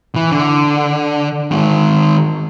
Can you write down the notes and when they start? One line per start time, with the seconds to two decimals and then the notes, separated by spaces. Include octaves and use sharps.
0.15 E3
0.32 D3
1.51 D#3 G#3